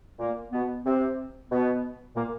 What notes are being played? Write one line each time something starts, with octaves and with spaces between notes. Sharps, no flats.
A#2 A#3
B2 B3
C3 C4
B2 B3
A#2 A#3